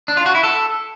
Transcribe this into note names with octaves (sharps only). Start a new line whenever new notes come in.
D4
F4
F#4
E4
A4